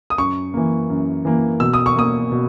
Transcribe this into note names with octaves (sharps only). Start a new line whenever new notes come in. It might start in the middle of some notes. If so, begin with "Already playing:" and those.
D#6
F#2 C#6
E3 A#3
F#2
E3 A#3
B2 E6
D#6
C#6
A#3 D#6
B2